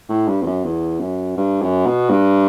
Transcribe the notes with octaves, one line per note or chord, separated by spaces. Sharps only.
A2
G2
E2
F#2
E2
F#2
G2
F#2
B2
G2